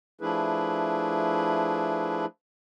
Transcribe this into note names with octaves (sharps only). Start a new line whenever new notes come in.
F3 A3 D4 E4 G#4 B4